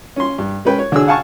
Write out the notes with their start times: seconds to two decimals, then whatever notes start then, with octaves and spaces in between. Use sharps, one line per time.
0.16 C#4 C6
0.38 G2
0.65 G#3 C#4 B4 G5
0.79 C#5
0.92 D3 D4 F#4 G#4 C#5 E6
1.08 F5 F#5 G#5 A5 C#6